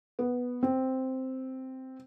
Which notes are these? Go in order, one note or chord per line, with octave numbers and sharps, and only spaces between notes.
B3
C4